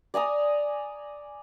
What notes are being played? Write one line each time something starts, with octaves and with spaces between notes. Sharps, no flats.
D5 G#5 A#5 D#6